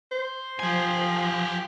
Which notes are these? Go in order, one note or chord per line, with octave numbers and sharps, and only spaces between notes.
C5
F3 G4 G#5